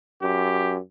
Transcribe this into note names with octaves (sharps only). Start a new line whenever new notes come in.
F#2 G4